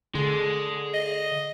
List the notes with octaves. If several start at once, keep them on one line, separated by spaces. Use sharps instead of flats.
D3 G#4 C6
D#5